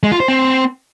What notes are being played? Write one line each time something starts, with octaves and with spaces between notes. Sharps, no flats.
G#3
F4
C5
C4